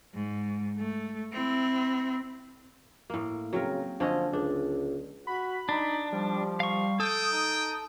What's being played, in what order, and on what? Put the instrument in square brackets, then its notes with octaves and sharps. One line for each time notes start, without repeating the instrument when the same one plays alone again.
[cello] G#2
A3
C4 E4
[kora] A2 A#3
[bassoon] C#3 [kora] F#3 C4 A#4
[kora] D3 C#4 D#5 [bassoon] F3
[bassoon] C#2 [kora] D4
[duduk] F#4 [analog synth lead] B5
[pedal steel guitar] D4 [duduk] D#4
[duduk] F3 [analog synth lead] G3
[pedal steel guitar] F5 C#6
[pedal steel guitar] A4 [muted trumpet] G5 [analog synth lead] D#6
[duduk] D#4